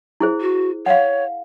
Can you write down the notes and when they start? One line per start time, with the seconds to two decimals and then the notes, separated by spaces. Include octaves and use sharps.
0.20 E4 G#4 C5
0.41 F#4
0.86 C#5 F5 F#5